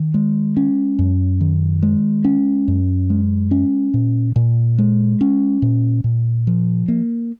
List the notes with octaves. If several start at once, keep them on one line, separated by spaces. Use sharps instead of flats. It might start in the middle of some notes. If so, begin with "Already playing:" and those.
Already playing: D#3
G#3
C#4
F#2
D#3
G#3
C#4
F#2
G#3
C#4
A#2
A#2
G#3
C#4
A#2
A#2
F3
A#3